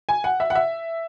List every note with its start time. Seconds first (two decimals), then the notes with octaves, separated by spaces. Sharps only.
0.09 G#5
0.24 F#5
0.40 E5
0.50 F#5
0.55 E5